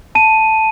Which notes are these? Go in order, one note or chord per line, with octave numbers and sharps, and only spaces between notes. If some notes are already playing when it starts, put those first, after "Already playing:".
A5 D#7